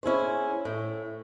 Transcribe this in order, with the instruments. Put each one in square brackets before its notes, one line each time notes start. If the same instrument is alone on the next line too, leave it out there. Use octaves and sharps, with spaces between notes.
[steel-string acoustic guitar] C#4 E4 G#4 C5
A2